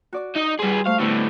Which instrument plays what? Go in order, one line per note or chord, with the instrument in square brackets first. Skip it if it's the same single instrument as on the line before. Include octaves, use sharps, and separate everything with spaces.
[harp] F#4 D5 D6
[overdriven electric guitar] D#4 D#5
[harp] G3 C6 [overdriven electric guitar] G#4 B4
[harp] A3 C5 C#6 [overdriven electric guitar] F5
[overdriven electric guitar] A2 D3 [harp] B3 G4